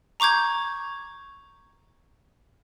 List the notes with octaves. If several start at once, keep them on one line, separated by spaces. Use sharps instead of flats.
A#5 C#6 D6 G6 G#6